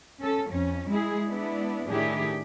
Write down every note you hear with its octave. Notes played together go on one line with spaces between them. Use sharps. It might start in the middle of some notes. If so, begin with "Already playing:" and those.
C#4 A4
F2 C#4
G#3 E4 G#4
G#3 B3 D4 E4
A2 D#3 D4 E4 G4 G#4